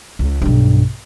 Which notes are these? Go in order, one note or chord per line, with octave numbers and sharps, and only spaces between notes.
C#2
B1 G2